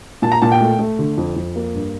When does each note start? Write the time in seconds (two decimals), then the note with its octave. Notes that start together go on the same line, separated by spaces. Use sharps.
0.22 A#2 A5
0.32 A#5
0.42 A#2 A5
0.52 G5
0.61 A3
0.79 A3
0.99 D3
1.18 F2
1.36 F2
1.56 A#3
1.74 G2